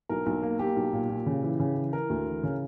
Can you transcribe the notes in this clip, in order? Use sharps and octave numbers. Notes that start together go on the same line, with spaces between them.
B1 A#4
B1
A#3
A#3 G4
B1
A#2
A#2
C#3
E3
C#3
E3
E3 A#4
D2
E3
C#3